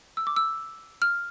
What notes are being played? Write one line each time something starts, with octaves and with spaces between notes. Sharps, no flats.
E6
D6
E6
F6